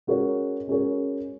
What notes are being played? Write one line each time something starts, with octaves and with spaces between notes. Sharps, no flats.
G#3 C#4 F#4 A#4 C#5
G#3 C#4 F#4 A#4 C#5